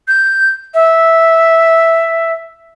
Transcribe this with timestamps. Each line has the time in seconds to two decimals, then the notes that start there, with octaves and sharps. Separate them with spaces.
0.08 G6
0.74 E5